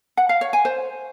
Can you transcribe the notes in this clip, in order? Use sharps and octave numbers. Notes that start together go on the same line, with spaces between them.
F#5
F5
C#5
G#5
C5